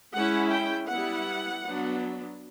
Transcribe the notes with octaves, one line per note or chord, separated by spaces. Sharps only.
G#3 C#4 E4 F#5
G5
G3 B3 E4 F#5
F#3 B3 D4